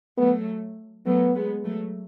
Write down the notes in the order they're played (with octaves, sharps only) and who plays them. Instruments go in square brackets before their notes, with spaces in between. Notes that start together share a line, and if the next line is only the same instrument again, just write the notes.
[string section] F#3 A3 [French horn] B3
[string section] F#3 A3 [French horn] B3
[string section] G#3 B3
F#3 A3